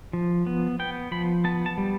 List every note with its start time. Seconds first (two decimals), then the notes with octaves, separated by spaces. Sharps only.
0.13 F3
0.46 B3
0.79 B3 G5
1.11 F3 B5
1.44 B3 A5
1.66 A5
1.78 G3